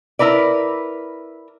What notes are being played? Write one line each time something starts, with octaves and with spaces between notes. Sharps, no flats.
E4 A#4 B4 D5